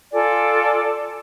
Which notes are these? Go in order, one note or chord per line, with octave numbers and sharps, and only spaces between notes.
F4 A4 D5 G#5